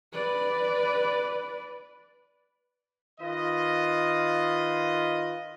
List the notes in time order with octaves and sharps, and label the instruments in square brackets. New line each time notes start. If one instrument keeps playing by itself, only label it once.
[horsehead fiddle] B4 D5
[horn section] D#3 F4 B4 D#5